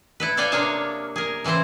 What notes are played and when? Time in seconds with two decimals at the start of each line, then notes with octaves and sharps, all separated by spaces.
0.20 E4 A4 B4
0.37 A4 C#5 D5 F5 G5 G#5
0.52 C3 A#3 D4 G#4 C#5 A5
1.16 G#4 A#4
1.44 C#3 E3 C4 E4 C5